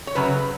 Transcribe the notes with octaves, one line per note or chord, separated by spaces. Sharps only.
C#5
F#2 C#3 F#3 B4